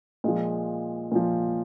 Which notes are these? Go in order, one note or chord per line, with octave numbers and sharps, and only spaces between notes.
A#2 F3 G#3
A#2 F3